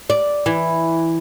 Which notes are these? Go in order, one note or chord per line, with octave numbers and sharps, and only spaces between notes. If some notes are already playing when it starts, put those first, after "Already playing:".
D5
E3